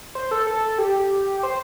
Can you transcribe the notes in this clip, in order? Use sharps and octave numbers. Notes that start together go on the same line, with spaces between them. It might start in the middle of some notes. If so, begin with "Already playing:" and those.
C5
A4
A4
G4
C5